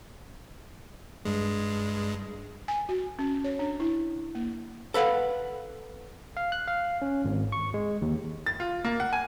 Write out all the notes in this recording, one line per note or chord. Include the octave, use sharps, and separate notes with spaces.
G2 G#3
G#5
F#4
C#4
C#5
D4
E4
A#3
A4 B4 F5 F#5
F5
F#6
F5
C#4
G#1
C#6
G#3
D#2
A6
F4
A#3
F#5
G#5